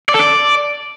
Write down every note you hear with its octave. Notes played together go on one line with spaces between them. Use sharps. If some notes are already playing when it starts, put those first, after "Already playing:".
D5
A4
D5